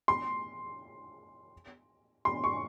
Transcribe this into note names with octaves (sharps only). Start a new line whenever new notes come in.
C6
C6
C#6